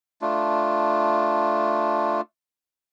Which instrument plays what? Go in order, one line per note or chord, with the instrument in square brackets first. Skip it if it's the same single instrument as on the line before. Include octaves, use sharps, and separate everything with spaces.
[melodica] A3 D4 F4